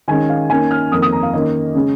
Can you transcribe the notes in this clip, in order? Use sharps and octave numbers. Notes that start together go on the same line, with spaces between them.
D#3 G#3 C#4 G#5
F5
D#3 A#3 C#4 G#5
F6
F2 D#3 A#3 D#6
D#6
A#5
F5
D#3 A#3 C#4 D#5
C#3 G#3 C#4